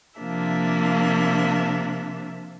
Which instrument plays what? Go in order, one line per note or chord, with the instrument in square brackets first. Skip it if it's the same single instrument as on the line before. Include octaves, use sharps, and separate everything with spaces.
[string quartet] C3 F3 A#3 D4 E5